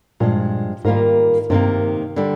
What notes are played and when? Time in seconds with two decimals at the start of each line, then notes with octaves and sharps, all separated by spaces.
0.20 G2 A#2 F3 G#3
0.85 G#2 D#3 G3 A#3 F4 A#4
1.50 G2 C3 D#3 A#3
2.16 D3 G3